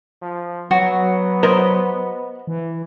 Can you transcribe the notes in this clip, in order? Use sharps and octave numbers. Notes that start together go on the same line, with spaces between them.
F3
F#3 B3 F#4
A#4 C5 D#5
E3